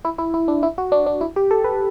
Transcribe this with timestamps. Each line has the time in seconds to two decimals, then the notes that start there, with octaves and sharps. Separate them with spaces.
0.05 E4
0.18 E4
0.34 E4
0.48 D4
0.63 E4
0.78 F#4
0.92 D4
1.06 D4
1.21 E4
1.36 G4
1.51 A4
1.64 B4